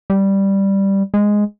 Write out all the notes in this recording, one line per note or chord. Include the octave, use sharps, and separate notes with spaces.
G3
G#3